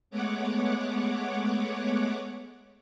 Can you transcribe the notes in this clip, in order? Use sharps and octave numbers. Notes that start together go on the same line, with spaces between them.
G#3 A3 B3 C#5 F#5 D6